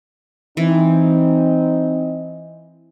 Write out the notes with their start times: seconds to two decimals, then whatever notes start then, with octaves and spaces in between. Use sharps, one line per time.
0.57 E3 C4 D#4 D#5